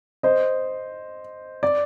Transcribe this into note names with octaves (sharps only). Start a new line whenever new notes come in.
C5 D#5
D5